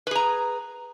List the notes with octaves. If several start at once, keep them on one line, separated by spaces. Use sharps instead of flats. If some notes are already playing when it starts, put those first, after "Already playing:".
G#4 B4 A#5